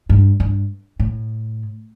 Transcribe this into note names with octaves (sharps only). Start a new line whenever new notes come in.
G2
G2
A2